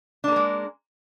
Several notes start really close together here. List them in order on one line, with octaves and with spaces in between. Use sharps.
D4 A#3 A#4 G#3